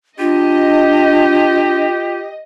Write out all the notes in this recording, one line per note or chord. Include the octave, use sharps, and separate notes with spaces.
D4 F4 G4 D#5